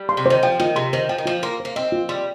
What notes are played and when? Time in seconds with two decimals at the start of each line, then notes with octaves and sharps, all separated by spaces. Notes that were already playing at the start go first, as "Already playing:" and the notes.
Already playing: G3
0.09 C6
0.17 C3
0.26 D#3 C5
0.43 F3 G5
0.60 D#3 F4
0.76 C3 C6
0.93 D#3 C5
1.09 F3 G5
1.18 D#3
1.25 F3 F4
1.43 A#3 C6
1.60 C5
1.65 A#3
1.76 C4 D#5
1.92 F4
2.09 G3 C6